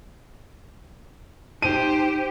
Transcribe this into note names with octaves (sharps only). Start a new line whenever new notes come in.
D#4 G4 C5 D#7